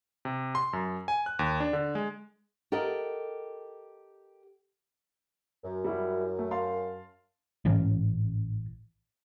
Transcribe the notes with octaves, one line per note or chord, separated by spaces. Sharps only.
C3
C6
F#2
G#5
F#6
D#2
D4
D3
G#3
G4 A4 A#4 D#5 F#5
F#2
G3 E4 F#4
A3
F5 A5 C6
A1 G#2 E3 C#4